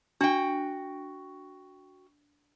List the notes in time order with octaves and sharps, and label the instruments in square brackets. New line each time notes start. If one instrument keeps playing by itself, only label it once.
[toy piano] D4 [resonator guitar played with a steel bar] F#4 G5